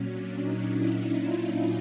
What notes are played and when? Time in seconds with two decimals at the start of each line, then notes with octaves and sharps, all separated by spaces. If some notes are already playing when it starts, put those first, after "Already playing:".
Already playing: A#2 F#3 C#4
0.11 D4
0.43 D#4
0.74 E4
1.20 F4